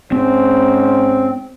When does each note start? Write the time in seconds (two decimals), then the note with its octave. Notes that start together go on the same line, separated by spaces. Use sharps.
0.12 G#2 C4 C#4 C5